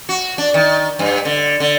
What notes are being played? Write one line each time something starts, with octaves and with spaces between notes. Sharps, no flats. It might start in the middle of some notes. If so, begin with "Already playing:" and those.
F#4
D4
D#3
G2
D3
D3